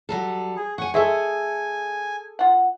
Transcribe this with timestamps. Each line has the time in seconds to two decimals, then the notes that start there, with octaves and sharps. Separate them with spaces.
0.09 F#3 G3 A4
0.57 G#4
0.78 F#5 G#5 C#6
0.94 G#3 G#4 A4 E5 G#5 C#6
2.39 F4 F#5